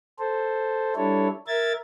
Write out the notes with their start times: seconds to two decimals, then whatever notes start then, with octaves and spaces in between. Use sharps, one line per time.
0.19 A4 C5
0.96 G3 D4 E4 A4 C#5
1.47 A#4 E5 G#6 A6